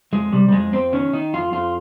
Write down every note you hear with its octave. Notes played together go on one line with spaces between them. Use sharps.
F2 G#3
C3 G3
G3
F2 G#3
F2 C4
D#3 C#4
D#3 D#4
F2 F4
F2 F4